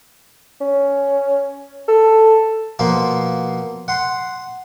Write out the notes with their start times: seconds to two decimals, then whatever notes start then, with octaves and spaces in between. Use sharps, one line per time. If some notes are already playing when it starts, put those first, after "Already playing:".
0.60 C#4
1.88 A4
2.79 B2 F3 A#3 F4
3.88 F#5 C6